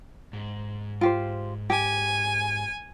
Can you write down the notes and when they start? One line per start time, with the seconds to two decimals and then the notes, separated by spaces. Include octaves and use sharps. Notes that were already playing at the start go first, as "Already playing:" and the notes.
0.33 G#2
1.01 F4 G4 C5
1.70 G4 G#5